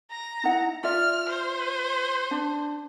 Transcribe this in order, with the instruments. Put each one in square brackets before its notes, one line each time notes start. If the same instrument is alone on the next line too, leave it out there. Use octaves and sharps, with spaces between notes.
[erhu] A#5
[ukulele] D#4 E4 F#5
[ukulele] F4 D5 E5 [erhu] F6
[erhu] C5
[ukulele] D4